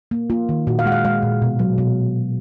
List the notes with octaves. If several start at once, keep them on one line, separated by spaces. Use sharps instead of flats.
A#3
A#3 F4
D#3
A#2 F#4
F5
G#3 F#5
F5
G#3 F5
A#2
B2
F#3
B2